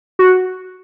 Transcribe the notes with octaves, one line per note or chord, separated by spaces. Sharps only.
F#4